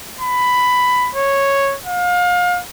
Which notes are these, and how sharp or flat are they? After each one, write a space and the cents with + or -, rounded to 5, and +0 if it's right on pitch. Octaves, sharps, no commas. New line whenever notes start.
B5 +10
C#5 -5
F5 +30